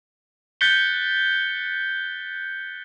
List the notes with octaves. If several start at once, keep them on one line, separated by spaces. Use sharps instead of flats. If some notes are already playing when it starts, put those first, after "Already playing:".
F#6 G6 A6 B6 C#7 G7